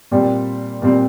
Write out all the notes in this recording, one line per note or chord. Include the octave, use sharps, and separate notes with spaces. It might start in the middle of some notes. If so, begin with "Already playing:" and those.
A#2 G3 C4
A#2 G3 C4